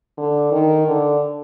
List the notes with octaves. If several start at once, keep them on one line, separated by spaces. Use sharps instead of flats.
D3
D#3
D3